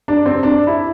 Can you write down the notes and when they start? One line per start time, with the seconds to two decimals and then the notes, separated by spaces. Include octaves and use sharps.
0.08 D4
0.26 C4
0.43 D4
0.67 E4